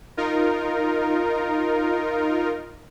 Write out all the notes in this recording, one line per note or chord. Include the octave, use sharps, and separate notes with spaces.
D#4 F4 A#4